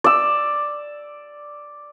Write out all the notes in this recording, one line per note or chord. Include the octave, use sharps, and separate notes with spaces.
D5 E6